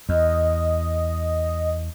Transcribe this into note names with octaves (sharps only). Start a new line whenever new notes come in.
E2 D#5